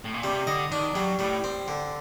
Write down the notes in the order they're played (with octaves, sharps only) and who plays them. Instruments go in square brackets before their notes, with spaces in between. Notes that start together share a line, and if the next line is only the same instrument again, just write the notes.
[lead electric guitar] A2
A#2
[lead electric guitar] C3 [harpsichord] G3
[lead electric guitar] D3 [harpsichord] D#5
[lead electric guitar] D#3 [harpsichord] D4
[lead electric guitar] F#3 [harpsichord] G3
[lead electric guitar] A2 [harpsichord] G3
[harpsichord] C4
D3